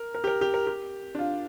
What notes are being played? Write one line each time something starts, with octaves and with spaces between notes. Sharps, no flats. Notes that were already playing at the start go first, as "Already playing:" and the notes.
Already playing: A#4
A#4
G4
A#4
G4
A#4
G4
D4
F4